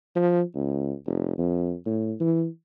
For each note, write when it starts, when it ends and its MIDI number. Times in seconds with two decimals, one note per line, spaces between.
0.16 0.42 53
0.55 0.93 37
1.06 1.34 29
1.38 1.73 41
1.86 2.14 45
2.20 2.46 52